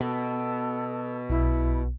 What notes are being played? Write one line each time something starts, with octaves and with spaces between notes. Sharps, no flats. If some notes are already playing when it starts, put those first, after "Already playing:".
B2 A4
B1 E4